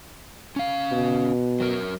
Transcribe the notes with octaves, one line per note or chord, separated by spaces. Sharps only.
C#4 F5
B2
F#3 A#4